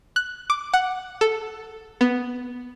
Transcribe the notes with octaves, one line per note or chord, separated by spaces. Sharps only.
F#6
D6
F#5
A4
B3